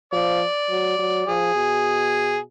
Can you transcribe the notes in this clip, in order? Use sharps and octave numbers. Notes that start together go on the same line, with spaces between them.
F3 D5
F#3
F#3
F3 G#4
B2